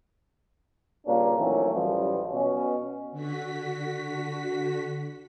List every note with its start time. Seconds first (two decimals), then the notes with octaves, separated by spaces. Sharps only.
1.06 G2 A#2 C#3 A#3 C#4 D4
1.37 D#3 E3 F#3 A3 C4 C#4
1.73 A1 F#2 E3 F3 G3
2.32 B2 C#4
3.12 D3 F#4 B6